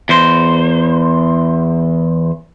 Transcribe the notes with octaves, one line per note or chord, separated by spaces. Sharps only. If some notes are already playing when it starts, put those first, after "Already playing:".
E2 C5